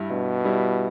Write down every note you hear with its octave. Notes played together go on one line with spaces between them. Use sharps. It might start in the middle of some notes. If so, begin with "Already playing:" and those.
Already playing: G2 G3 E4
G2 B2
G3 E4